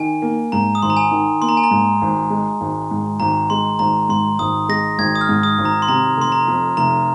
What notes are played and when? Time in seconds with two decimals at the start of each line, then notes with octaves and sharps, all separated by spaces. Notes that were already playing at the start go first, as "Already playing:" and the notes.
Already playing: D#3 G#5
0.22 A#3
0.52 G#2 A#5
0.75 D#6
0.82 G#1 C6
0.90 A#5
0.97 G#5
1.11 D#3
1.41 A#3 C6
1.49 A#5
1.57 G#5
1.64 A#5
1.71 G#2
2.02 G#1
2.30 G#3
2.61 G#1
2.91 G#2
3.20 G#1 A#5
3.50 G#3 C6
3.79 G#1 A#5
4.09 G#2 C6
4.39 G#1 D#6
4.69 G#3 A#6
4.99 G#1 G#6
5.15 D#6
5.21 F6
5.29 G#2
5.43 D#6
5.58 G#1
5.65 A#5
5.82 C6
5.88 C3 A#5
6.17 F1 C6
6.32 A#5
6.47 F2
6.77 F1 A#5